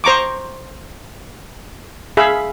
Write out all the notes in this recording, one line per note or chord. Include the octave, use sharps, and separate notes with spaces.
C5 A#5 C#6 D6
G#4 E5 F5 B5